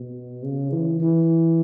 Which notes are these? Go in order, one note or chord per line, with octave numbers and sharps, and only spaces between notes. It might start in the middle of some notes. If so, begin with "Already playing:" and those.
Already playing: B2
C#3
E3
E3